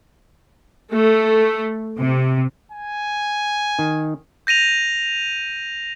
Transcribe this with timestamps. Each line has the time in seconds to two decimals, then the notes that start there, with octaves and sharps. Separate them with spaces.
0.90 A3
1.98 C3
2.72 G#5
3.79 D#3
4.47 G6 A#6 D#7 F7